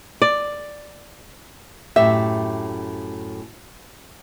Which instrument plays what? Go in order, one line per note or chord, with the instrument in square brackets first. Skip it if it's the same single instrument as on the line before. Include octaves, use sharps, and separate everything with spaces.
[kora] D5
[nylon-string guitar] F#2 A2 G4 [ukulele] E5